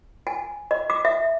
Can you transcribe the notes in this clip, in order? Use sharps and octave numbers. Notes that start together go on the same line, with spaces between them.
G#5
D#5
D6
E5